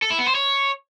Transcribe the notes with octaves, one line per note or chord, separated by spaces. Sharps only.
A4
E4
B3
C5
C#5